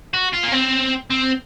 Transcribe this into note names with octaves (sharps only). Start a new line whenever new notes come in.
F#4
F4
A#3
C4
C4